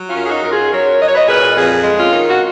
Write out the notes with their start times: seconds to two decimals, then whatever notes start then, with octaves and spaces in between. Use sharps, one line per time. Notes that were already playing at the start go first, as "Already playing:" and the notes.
Already playing: F#3
0.09 C#4 F4
0.16 F#2
0.26 G#4
0.30 D#4 F#4
0.43 F#2 A#4
0.51 F4 G#4
0.72 F#3 A#4 C#5
1.00 F#3 D#5
1.07 C#5
1.15 B4 D#5
1.28 A#2 G#4 B4
1.56 F2 F4 G#4
1.84 G#3
1.98 C#4 F4
2.12 D#3
2.29 F#4